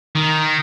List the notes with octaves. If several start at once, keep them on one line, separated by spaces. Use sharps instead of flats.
D#3